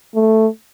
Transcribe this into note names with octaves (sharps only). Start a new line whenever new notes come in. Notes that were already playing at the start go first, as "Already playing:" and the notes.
A3